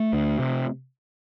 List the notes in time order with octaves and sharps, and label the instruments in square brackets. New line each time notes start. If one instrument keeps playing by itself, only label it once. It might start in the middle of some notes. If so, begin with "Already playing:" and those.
Already playing: [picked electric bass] A3
D2
C3